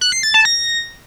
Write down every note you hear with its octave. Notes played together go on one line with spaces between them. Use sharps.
F#6
C7
A6
A5
A#6